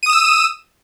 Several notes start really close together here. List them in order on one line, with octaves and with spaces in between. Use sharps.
D#7 D#6 E7 E6